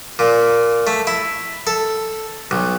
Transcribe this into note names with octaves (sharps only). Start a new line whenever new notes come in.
A#2
A3
E4
A4
B1